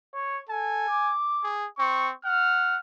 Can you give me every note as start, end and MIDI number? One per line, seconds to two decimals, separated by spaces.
0.15 0.40 73
0.49 0.86 69
0.49 1.13 80
0.89 1.52 86
1.43 1.67 68
1.79 2.12 60
1.79 2.11 85
2.25 2.77 78
2.25 2.77 89